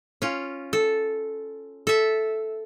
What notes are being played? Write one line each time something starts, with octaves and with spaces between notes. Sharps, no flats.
C#4 F4
A4
A4 E5